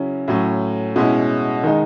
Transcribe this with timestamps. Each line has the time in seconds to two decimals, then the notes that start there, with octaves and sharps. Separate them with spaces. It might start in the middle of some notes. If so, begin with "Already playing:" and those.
Already playing: C#3 F#3 C#4 E4
0.28 A2 F#3 C#4
0.96 B2 G#3 C#4 E4
1.63 D#3 G#3 D#4